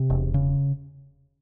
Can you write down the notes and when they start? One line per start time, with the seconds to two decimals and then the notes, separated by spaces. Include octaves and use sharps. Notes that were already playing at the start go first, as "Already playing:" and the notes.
Already playing: C3
0.10 E1
0.34 C#3